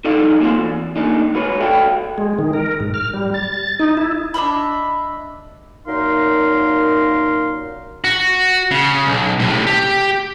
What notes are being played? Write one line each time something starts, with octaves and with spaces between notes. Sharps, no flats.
D#4 E4 A4 D5 D#5 F5
A#3 C4 F4 F#4 C5
E2
D#2 C#3 A#3 D4 D#4
G#2 F#4 B4 C#5
F#4 A4 D5 E5 G5
G#3
D#3
A#4
G#2
F6
G3
A6
D#4
E4
D4 D#5 E5 B5
F#2 A#2 D#4 A#4 F5 C6
F#4
C#3
B1
A2 C3
G4